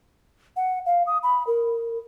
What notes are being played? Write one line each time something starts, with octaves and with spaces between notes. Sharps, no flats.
F#5
F5
D#6
B5
A#4